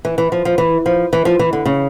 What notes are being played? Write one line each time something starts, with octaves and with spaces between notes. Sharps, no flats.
E3
E3
F3
F3
E3
F3
E3
F3
E3
D3
C#3